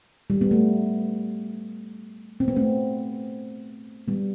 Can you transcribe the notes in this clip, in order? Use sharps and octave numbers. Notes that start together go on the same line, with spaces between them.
G3
B3
A3
C4
B3
A3 C4
G3 B3